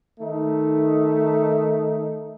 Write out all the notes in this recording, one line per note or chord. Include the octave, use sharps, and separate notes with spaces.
D#3 A3 D#4